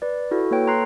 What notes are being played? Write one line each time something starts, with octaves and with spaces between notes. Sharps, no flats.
B4 D5
E4 F#4 A4
A#3 A4 B4 C#5 G5
C#5 A#5 C6 F#6 C7